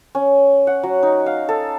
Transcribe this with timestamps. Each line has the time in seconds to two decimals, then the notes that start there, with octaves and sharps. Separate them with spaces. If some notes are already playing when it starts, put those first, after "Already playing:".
0.15 C#4
0.67 F#5
0.83 F#3
1.03 D#4
1.26 F5
1.49 A4